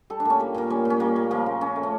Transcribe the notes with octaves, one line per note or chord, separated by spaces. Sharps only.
G3 A4
D4
A#2 C#4
G3 A#3
A#2 A#3
G3 C#4
A#2
C#4
G3 A#3
A#2
F3 A#3
C#3
C#3 C#4
A3
C#4